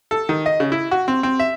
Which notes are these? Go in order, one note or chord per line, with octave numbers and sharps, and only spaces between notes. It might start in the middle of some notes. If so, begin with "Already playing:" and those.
A4
D#3
D#5
C#3
E4
F#4
C4
C4
E5